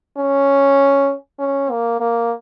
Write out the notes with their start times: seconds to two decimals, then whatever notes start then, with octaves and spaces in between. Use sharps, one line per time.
0.17 C#4
1.39 C#4
1.70 A#3
2.00 A#3